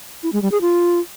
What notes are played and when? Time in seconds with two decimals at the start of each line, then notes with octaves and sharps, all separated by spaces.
0.23 E4
0.33 G#3
0.42 G3
0.52 G#4
0.61 F4